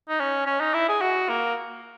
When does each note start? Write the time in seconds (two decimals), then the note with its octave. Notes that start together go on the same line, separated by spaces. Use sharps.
0.09 D#4
0.20 C#4
0.47 C#4
0.60 D#4
0.74 E4
0.88 G#4
1.01 F#4
1.29 A#3